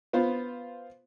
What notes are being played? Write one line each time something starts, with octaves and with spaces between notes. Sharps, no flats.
B3 F4 C5